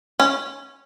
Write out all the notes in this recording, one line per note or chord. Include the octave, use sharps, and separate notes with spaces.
C#4